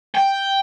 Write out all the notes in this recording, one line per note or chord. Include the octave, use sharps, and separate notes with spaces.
G5